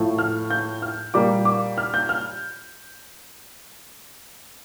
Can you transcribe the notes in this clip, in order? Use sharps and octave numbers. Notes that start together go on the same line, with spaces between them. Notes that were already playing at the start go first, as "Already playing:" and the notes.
Already playing: A2 F3 A3
F6
G6
F6
A#2 G3 A#3 D6
D6
F6
G6
F6